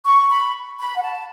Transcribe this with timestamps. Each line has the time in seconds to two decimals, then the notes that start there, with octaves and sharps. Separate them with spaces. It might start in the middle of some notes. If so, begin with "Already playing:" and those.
0.05 C#6
0.30 B5
0.78 B5
0.97 F#5
1.01 A5